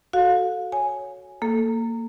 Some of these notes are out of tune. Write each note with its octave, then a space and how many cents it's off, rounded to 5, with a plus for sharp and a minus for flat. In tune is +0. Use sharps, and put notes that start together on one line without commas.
F#4 +0 A4 -10 F5 +35
C#5 +0 G#5 +5
A#3 -20 A4 +0